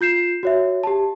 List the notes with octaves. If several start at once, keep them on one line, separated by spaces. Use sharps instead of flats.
F4 G6 C7 E7
F#4 C#5 E5
G4 A5